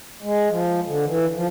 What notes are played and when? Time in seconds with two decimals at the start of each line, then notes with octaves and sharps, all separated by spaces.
0.22 G#3
0.49 F3
0.86 D3
1.06 E3
1.34 F3